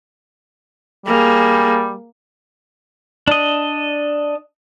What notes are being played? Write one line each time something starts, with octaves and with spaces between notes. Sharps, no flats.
G3 A#3 G#4
D4 D#5